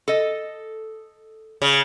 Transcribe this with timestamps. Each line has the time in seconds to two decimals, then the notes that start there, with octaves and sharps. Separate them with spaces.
0.08 A4 D#5
1.62 C#3